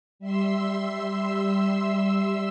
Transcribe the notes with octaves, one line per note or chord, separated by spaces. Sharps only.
G3 E5 C6 E6